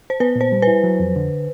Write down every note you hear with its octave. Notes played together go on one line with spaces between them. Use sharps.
C5
B3 B4
A#2
C5
G3
E4 B4
F#3
F2
D3